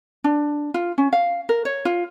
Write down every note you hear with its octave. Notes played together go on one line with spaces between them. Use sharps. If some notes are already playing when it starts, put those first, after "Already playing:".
D4
F4
C#4
F5
A#4
C#5
F4